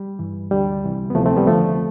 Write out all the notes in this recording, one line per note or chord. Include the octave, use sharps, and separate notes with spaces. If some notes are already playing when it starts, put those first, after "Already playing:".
Already playing: G3
G2 E3
D2 D3 G3
C2 C3 E3
B3
D2 C3 E3 F3 A3
A3 C4
G3 B3
F2 D3 F3 A3